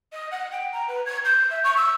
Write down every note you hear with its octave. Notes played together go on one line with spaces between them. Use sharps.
D#5
F#5
G5
A#5
B4
G#6
G6
E5
C#6
E6